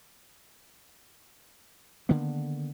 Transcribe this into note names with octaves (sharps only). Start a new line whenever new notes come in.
D3 D#3 A#3 B3